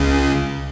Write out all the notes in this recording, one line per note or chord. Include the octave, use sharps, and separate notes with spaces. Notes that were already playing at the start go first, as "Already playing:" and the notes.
Already playing: C#2 C#3